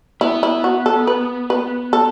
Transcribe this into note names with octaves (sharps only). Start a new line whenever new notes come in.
B3 E4
E4
F#4
A4
B4
B4
A4